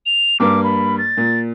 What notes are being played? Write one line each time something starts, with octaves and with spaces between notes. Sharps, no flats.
F7
G2 A#3 D6
B5
A6
A#2